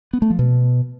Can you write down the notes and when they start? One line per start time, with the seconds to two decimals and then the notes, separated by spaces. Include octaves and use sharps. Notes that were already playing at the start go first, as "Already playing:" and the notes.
0.13 B3
0.22 A3
0.30 F3
0.39 B2